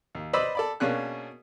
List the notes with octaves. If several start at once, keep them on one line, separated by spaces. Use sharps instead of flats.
D#2
B4 C5 D5 D#5 B5 E6
A4 D5 B5
B2 A#3 C#4 D4 G#4 F#6